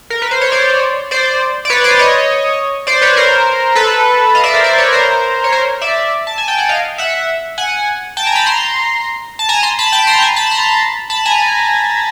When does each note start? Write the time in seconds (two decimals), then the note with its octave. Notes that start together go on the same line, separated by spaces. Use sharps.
0.10 A#4
0.22 B4
0.31 C5
0.41 C#5
0.52 C5 D5
1.11 C5 D5
1.65 D5
1.70 B4 C#5
1.84 C5 D5
1.99 C#5 D#5
2.87 C5 D5
3.02 B4 C#5
3.17 A#4 C5
3.75 A4 B4
4.35 D#5 F5
4.44 D5 E5
4.54 A#4 C5
4.64 C5 D5
4.78 B4 C#5
4.93 A#4 C5
5.44 C#5
5.52 A#4 C5
5.81 D5 E5
6.27 A5
6.38 G#5
6.48 G5
6.58 F#5
6.69 D#5 F5
6.98 E5 F#5
7.58 F#5 G#5
8.17 G5 A5
8.26 G#5 A#5
8.35 A5 B5
8.46 A#5 C6
9.39 A5
9.49 G#5 A#5
9.63 A#5 C6
9.79 A5 B5
9.92 G5 A5
10.07 A#5 C6
10.22 G#5 A#5
10.36 A5 B5
10.51 A#5 C6
11.10 A5 B5
11.25 G#5 A#5